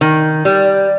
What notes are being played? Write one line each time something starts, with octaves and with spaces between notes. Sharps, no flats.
D#3
G3